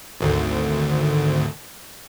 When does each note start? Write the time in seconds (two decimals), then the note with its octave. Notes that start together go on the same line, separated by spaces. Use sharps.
0.21 G#1 D2